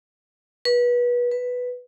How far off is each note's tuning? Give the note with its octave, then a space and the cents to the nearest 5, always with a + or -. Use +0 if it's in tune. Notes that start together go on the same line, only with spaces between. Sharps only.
B4 -25
B4 +0